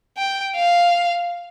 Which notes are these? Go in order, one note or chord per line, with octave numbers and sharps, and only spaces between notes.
G5
F5